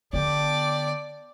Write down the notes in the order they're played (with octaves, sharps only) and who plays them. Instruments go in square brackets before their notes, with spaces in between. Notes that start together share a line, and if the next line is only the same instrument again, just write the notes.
[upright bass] D3 B3 [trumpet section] D4 G4 [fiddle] D5